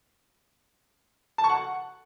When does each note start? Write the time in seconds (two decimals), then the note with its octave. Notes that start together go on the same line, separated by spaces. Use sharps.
1.38 A5
1.44 C#6
1.50 F#5